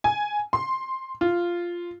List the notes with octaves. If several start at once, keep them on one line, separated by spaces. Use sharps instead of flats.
G#5
C6
F4